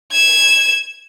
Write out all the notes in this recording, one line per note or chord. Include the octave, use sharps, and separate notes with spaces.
G#6 E7